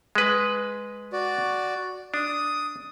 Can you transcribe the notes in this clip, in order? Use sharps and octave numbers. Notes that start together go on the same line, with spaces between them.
G#3 B4
F#4 D5
D4 D#6